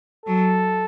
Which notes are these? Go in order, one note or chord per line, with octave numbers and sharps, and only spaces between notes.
F#3 A4